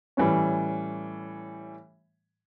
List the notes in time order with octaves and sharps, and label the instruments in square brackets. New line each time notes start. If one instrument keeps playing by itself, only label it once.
[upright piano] A2 E3 G3 C#4